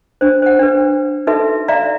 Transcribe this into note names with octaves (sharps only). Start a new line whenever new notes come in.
D4 C5
C5 F#5
D4 B4
D#4 F#4 A4 B4 E5
D5 E5 F5 A#5